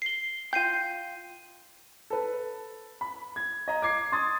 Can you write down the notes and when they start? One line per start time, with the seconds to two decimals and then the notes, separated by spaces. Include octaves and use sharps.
0.02 C7 G7
0.53 F4 G5 G6 C7 D#7
2.10 A4 B4
3.01 B5
3.36 G#6
3.68 D#5 A#5
3.82 D6 G#6 C7
4.12 C6 D#6 A6